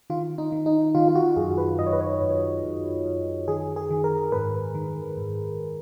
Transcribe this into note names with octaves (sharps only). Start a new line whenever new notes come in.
D#3 F4
D#4
D#3
D#4
D#3 F4
F4
F#4
F#2 G#4
B4
F#2 D#5
C#5
B4
C#5
F#2
F#2
F#2
D#3 G#4
G#4
D#3
A#4
G#2 B4
D#3
G#2